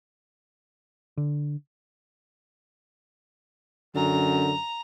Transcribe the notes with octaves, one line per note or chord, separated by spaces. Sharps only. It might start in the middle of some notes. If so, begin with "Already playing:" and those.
D3
F#2 D3 A#5